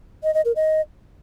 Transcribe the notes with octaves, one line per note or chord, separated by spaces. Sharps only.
D#5
D#5
A#4
D#5